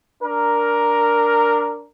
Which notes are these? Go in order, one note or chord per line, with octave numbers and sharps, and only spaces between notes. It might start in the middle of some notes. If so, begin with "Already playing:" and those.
D4 A#4